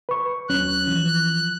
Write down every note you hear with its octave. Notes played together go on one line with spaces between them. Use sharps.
B4 C#6
D#2 F#3 C#4 F#6
E3 F3